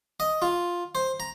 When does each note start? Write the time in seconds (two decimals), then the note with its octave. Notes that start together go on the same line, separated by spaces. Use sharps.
0.20 D#5
0.42 F4
0.95 C5
1.20 A#5